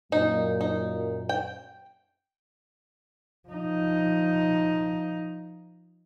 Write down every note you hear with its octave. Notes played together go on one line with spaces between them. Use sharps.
F#2 A#2 D#4
D#4
G5
F3 D#4